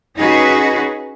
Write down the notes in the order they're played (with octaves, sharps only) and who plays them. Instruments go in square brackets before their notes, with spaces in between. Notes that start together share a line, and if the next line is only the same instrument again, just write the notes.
[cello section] C#4 D#4 F#4 G#4 B4